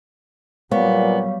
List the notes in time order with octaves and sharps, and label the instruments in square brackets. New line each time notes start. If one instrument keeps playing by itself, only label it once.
[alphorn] A#2 [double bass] F#3 G3 [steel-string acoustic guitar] B3 [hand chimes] C#5 F5 C#6